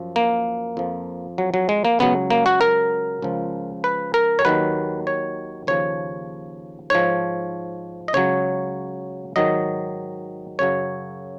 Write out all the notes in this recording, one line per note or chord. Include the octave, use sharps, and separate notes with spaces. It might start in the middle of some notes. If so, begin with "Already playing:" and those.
Already playing: F#2 F3
A#3
F2 F3
F#3
F#3
G#3
A#3
C#2 C#3 F#3 B3
A#3
F#4
A#4
C#2 C#3 F3
B4
A#4
C#5
D#2 D#3 F#3 B4
C#5
D#2 C#3 F3 C#5
G#2 F3 C#5
D#5
C#2 C#3 F#3 C#5
G#2 D#3 F#3 D#5
F#2 C#3 F#3 C#5